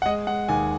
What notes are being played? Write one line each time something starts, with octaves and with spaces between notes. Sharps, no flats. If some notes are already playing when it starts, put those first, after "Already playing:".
F#5
G#3 D#5
G#3 F#5
D#2 G#5